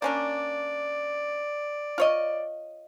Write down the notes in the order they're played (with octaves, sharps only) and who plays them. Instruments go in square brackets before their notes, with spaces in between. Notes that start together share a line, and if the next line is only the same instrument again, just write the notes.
[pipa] A#3 C#4 D4 [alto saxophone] D5
[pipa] F4 C#5 D#5